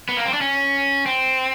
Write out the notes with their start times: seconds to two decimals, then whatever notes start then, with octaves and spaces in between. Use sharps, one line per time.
0.09 B3
0.17 A#3
0.25 C4
0.33 D4
0.41 C#4
1.06 C4